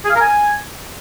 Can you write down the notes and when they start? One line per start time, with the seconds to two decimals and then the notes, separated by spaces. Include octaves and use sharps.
0.05 G#4
0.10 F5
0.15 A#4
0.21 G#5